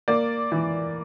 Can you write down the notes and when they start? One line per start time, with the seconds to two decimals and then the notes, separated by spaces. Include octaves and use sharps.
0.08 A#3 D5
0.52 E3